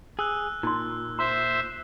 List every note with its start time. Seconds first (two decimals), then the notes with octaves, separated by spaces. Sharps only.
0.19 G#4 E6 F#6
0.63 A#2 D#4 C6
1.19 C5 E5 C6